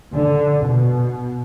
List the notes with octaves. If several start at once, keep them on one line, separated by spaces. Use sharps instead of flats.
D3
B2